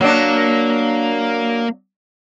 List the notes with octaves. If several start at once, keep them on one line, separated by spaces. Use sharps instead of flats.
F#3 A#3 D4